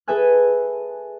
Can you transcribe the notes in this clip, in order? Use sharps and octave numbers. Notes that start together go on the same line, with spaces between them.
G#4 A4 B4 E5 G#5 F#6